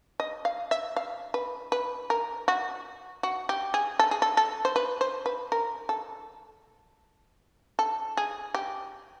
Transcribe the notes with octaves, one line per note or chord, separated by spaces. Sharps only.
D#5
F5
E5
F5
B4
B4
A#4
F#4
F#4
G4
G#4
A4
G#4
A4
A4
C5
B4
C5
B4
A#4
A4
A4
G#4
G4